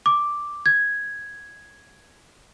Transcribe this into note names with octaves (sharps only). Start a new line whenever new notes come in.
D6
G#6